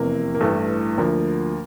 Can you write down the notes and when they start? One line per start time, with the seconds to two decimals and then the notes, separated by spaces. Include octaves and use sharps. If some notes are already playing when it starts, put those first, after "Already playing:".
Already playing: F1 E2 C3 E3 A#3
0.34 A#3
0.41 A1 G2 E3 A3
0.98 D2 D3 F3 A#3